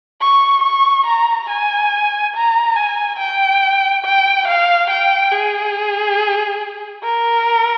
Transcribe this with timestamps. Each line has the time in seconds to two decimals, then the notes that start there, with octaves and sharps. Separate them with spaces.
0.21 C#6
0.63 C#6
1.06 A#5
1.49 G#5
2.35 A#5
2.76 G#5
3.19 G5
4.05 G5
4.48 F5
4.90 G5
5.32 G#4
7.04 A#4